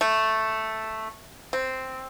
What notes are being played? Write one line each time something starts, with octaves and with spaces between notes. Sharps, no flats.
A3
C4